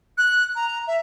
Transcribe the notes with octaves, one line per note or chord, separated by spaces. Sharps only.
F#6
A#5
E5